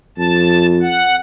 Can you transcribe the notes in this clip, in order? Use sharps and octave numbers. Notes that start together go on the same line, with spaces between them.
F2 A5
F#5